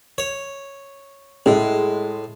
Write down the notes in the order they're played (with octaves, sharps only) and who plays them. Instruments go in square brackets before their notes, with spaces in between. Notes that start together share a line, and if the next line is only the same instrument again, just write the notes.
[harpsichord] C#5
[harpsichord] A2 [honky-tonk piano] G#3